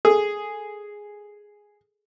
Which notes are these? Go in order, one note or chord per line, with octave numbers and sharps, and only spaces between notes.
G#4 A4